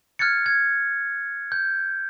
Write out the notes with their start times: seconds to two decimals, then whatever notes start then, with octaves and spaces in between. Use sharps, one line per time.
0.19 F6 F#6 G#6 A6 C#7
0.46 G#6
1.52 G6